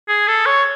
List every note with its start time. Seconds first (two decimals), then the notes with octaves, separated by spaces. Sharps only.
0.09 G#4
0.28 A4
0.46 C#5